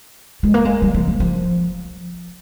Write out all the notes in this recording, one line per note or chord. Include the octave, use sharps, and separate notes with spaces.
G#3
A#3
G#3
G3
F3
D#3
F3